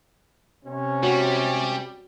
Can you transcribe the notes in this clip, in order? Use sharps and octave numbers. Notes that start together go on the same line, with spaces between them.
C3 C#4
G3 F#4 C#5